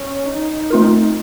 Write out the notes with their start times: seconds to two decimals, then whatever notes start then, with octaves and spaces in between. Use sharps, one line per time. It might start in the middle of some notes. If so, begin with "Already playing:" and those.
Already playing: C#4
0.26 D#4
0.70 A3 C4 F4 A#4